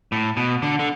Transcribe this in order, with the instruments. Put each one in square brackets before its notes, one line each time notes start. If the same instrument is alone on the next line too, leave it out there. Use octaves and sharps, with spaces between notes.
[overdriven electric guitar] A2
B2
D3
D3